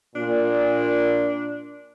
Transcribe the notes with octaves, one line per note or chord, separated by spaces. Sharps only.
A#2 D4